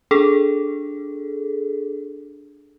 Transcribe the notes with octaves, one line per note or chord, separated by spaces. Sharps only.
D4 G#4 A4